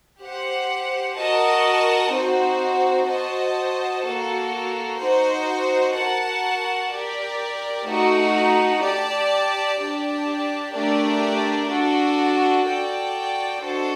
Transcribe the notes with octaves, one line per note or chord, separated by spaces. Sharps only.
G4 C5 F#5
F#4 A#4 D#5 A5
C4 D#4 F#4 C5
F#4 C5 D#5 A5
A#3 F#4 A4
D#4 F#4 C5
F#4 A#4 F#5 A5
G4 A#4 D5
A3 D#4 F#4
G4 D5 A5
D4 G4 D5 A5
A3 D4 G4 A#4 D5
D4 F#4 A4
F#4 A4 D5 G5
D4 F#4 A4 C5 D#5